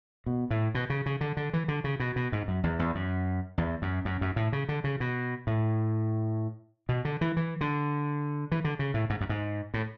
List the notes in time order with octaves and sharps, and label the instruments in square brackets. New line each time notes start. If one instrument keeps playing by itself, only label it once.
[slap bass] B2
A2
B2
C#3
C#3
D3
D3
E3
D3
C#3
B2
B2
G#2
F#2
E2
E2
F#2
E2
F#2
F#2
F#2
A2
C#3
D3
C#3
B2
A2
B2
D3
E3
E3
D3
E3
D3
C#3
A2
G#2
F#2
G#2
A2